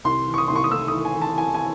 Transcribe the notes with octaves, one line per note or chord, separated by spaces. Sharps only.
C2 C6
E3
C#6
D#6
C2 C6
C#6
D#6
A3 E6
D#6
E3
G#5
E3
A5
E3 G#5
G#5